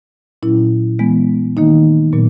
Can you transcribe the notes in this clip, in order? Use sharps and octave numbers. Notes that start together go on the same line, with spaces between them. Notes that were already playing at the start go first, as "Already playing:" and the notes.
A#2 F#3 C#4 E4
E3 G#3 B3
D#3 A#3 D#4
A#2 F#3 B3